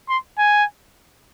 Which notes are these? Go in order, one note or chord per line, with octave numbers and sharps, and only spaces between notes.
C6
G#5